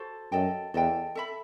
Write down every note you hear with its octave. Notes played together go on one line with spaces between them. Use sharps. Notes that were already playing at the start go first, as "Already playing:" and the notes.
Already playing: F#4 A4 C5
F#2 A4 D#5 G5
E2 A4 D#5 G5
A4 E5 B5